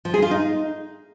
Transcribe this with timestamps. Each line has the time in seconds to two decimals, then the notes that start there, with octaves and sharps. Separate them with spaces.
0.05 F3
0.14 G#4
0.22 F4
0.31 D#4